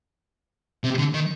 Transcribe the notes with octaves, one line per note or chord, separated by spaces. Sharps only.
C3
D3
D#3